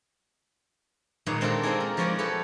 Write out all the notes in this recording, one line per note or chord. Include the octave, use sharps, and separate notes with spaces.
A#2 D#3 G#3 D#4 B4 C#5
G#3 C4 D4 F4 A4 A#4
A#3 C4 D#4 G#4
A#4
F3 G#3 F#4 B4 C#5 D5
G4 A4 B4 C#5